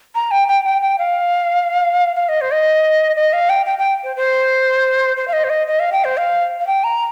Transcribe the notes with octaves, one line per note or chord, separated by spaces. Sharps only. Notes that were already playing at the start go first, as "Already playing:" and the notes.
A#5
G5
G5
G5
G5
F5
F5
D#5
C5
D#5
D#5
F5
G5
G5
G5
C5
C5
C5
F5
D#5
C5
D#5
D#5
F5
G5
C5
F5
F5
G5
A#5